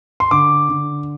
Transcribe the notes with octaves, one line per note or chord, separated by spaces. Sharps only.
C6
D3 D6
D3